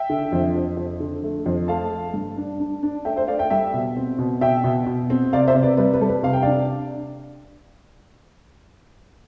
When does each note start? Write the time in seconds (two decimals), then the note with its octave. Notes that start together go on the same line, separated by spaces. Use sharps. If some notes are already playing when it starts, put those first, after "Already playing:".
Already playing: E5 G5
0.10 D3
0.32 F2
0.55 F2
0.77 F2
1.00 D3
1.24 A3
1.46 F2
1.68 A3 F5 A5
1.91 A3
2.14 G2
2.37 D4
2.60 D4
2.83 D4
3.05 A3 E5 G5
3.16 C5 E5
3.27 A3 D5 F5
3.39 E5 G5
3.50 G3 E5 G5
3.74 B2
3.97 C4
4.19 B2
4.41 B2 E5 G5
4.64 B2
4.86 B2
5.10 C4
5.33 C3 D5 F5
5.47 C5 E5
5.55 C3
5.63 B4 D5
5.78 G3 B4
5.94 B4
6.01 G3 A4
6.09 B4
6.23 C3 F5
6.33 G5
6.42 D4 D5 F5